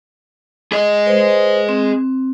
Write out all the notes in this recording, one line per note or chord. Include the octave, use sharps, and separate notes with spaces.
G#4 D#5
B4 C5
C4